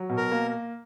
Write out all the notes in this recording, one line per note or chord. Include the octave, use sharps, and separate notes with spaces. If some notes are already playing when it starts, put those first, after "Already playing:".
Already playing: F#3
B2
A#4
A#3